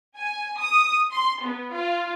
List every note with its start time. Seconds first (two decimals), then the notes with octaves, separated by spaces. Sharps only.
0.17 G#5
0.60 D#6
1.12 C6
1.42 B3
1.73 F4